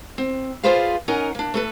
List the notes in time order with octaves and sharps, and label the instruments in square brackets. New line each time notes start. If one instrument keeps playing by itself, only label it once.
[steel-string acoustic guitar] C4
F4 G#4 B4 C5 D5 F5
C#4 D#4 A#4 D#5 F#5 G#5
A#3 D4
A3 A4 B4